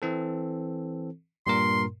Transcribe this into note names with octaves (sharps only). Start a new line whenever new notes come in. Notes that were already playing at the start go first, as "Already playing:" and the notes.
E3 C4 A4
G2 A#2 A#4 C6